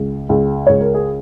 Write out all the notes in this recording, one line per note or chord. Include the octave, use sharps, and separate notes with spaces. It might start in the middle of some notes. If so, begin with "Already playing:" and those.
Already playing: C#2
C#2
C#2 C#5
A#4
G#4